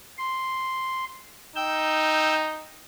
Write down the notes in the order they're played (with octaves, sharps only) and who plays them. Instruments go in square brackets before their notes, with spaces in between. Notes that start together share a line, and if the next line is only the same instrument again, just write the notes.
[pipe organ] C6
[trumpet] D#4 [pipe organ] G5 E6 G6